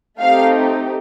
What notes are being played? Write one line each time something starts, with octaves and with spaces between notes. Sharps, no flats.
A3 C4 D#4 G4 F5